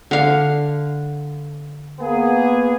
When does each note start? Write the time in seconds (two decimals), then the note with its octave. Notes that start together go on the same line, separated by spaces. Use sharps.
0.11 D3 F5
2.00 A#3 B3 G#4